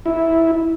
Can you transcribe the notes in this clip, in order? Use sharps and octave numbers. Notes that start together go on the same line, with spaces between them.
E4